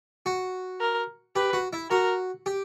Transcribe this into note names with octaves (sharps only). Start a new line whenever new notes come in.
F#4
A#4
G4 B4
F#4
E4
F#4 A#4
G4